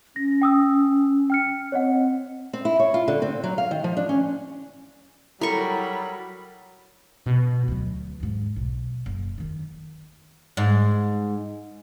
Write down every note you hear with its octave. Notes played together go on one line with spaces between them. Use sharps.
C#4 A#6
G5 D#6 E6
G5 F6 C#7
C4 C#5 D#5 F#5
C4
E4
C#5
F4
D3
C4
F#3
F5
D#3
F3
D4
C#4
F#3 G3 E4 A4 A#4 B5 C#6
B2
D2 F#3
D#2 G#2
B1
F#1
D#2 D#3
G#2